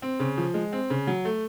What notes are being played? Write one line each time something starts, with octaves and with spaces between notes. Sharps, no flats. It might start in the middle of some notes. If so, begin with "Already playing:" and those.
C4
C#3
F3
G#3
C4
C#3
F#3
A3